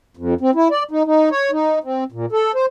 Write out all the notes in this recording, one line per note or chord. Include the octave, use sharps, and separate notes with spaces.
F2
C4
E4
D5
D#4
D#4
C#5
D#4
C4
A#2
A4
C5